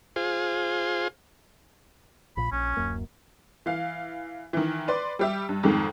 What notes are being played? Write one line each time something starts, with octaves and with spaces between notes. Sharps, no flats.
F4 G#4 C5
A#1 A#2 B5
A#1 C#4
D1 F#2 A#3
E3 F5
D#3 E3
B4 D5 C6
G3 G4 E5
G2
F2 G#2 D#3 G#3